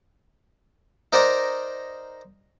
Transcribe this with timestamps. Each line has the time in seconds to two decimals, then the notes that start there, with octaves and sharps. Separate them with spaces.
1.13 D#4 A#4 C5 D5 F#5 A#5